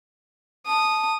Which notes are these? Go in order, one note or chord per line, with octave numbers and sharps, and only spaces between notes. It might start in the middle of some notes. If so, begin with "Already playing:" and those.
A5 D#6